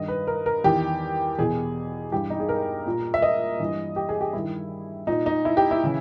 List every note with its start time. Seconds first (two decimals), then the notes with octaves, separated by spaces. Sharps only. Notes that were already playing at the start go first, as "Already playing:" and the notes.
Already playing: G2 D#3 D#5
0.08 B4
0.27 A#4
0.46 A#4
0.64 E2 D#3 G4
1.39 E2 B2 G#4
2.12 G2 E3 G4
2.30 D#4
2.40 G#4
2.49 A#4
2.86 A#2
3.14 E5
3.22 D#5
3.60 G2 E3
3.96 G4
4.09 G#4
4.21 G4
4.33 G2 D#3 E4
5.07 A#2 D#4
5.26 D#4
5.45 E4
5.57 G4
5.71 E4
5.84 C#3 E3